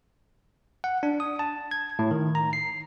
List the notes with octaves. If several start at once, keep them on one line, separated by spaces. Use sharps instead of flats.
F#5
D4
D#6
A5
G#6
A2
D#3
A#5
C7